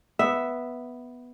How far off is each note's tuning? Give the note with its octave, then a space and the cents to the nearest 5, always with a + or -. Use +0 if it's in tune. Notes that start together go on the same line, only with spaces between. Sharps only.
B3 +0 E5 +0